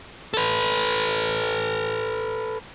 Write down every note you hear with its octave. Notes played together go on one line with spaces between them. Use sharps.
A4 B4